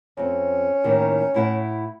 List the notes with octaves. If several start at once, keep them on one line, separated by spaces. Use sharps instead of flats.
F2 C4 C#4
D#2 A2 D#3
A2 E4 F#5